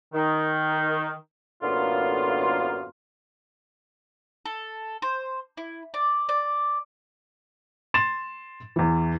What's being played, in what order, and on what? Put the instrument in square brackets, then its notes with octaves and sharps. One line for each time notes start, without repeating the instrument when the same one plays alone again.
[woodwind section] D#3
F#2 A2 D3 A#3 B3 F4
[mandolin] A4
C5
E4
D5
D5
[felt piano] C6 A6 E7
E2 E3